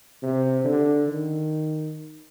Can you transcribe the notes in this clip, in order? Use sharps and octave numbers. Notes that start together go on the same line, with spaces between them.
C3
D3
D#3